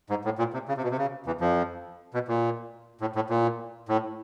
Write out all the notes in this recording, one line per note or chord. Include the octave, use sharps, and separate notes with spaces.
G#2
A2
A#2
C3
C#3
C3
B2
C3
C#3
E2 E3
F2 F3
B2
A#2
A2
A2
A#2
A2